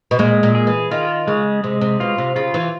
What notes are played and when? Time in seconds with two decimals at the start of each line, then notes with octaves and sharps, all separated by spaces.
0.11 B2
0.19 A#2 G#3
0.43 A#2
0.55 G#4
0.67 E3
0.91 D#3 F4
1.27 C#3 G#3
1.64 C3 G#3
1.81 C3
2.00 B2 F4
2.18 C3
2.36 C#3 F4
2.54 E3